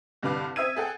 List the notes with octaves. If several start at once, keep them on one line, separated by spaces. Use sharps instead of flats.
C2 G2 D3 B4 F5 D6
C4 E5 D#6 E6 G#6 D#7
G#4 A4 F#5 G5